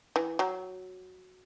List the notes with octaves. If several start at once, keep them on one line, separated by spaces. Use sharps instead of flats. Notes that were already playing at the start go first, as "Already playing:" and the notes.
E3
F#3